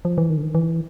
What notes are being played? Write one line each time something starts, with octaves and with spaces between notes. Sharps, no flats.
F3
E3
D#3
D3
D#3
E3